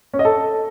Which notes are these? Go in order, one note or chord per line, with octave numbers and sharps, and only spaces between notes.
C#4
D#5
A4